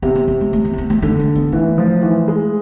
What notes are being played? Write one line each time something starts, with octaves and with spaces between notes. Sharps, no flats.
C3 B3
C4
B3
G#3
A3
C4
A3
B3
A3
D3 A3
G#3
B3
E3 A3
F3
E3
G#3